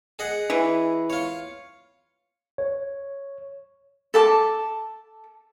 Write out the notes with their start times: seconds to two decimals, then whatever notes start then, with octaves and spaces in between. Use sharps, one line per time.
0.19 G#4 D#5 F#5
0.50 E3
1.10 F4 C#5
2.58 C#5
4.14 A4 A5 D6